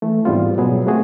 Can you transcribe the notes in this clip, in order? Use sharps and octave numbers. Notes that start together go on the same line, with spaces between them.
E3 A3
G#2 E3 G3 B3 C4 F4
B2 F#3 B3 G#4
A3 A#3 C4 F#4 G#4